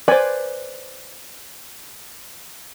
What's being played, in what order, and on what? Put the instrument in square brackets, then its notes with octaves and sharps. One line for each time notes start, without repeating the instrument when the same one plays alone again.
[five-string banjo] B4 C5 [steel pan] D5 G#5